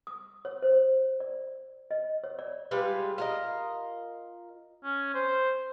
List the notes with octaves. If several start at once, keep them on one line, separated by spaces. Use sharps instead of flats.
D#6
C#5
C5
D5
D#5
C#5
D5
G3 G#3 F4 B4
F4 A#4 D#5
C#4
C5